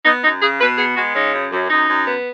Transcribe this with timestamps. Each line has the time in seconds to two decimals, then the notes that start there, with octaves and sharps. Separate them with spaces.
0.05 B3 D#4
0.24 F#2 D#4
0.41 C#3 G#4
0.60 B2 B4
0.78 B3 G#4
0.96 G#3 F#4
1.15 C#3 D#4
1.34 F#2
1.52 F#2
1.70 F#2 D#4
1.88 F#2
2.06 B3